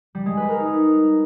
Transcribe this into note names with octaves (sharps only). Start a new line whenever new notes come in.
G3
G#3
B4
A#4
D#4